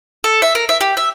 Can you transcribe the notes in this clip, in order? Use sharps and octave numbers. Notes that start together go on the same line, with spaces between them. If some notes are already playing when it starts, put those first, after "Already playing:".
A4
E5
A#4
E5
G4
E5